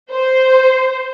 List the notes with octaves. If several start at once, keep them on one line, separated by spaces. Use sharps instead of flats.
C5